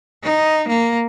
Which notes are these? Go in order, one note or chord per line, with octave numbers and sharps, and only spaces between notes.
D#4
A#3